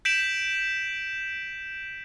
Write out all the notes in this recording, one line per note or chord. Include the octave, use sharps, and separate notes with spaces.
G6 B6 D7 E7 F#7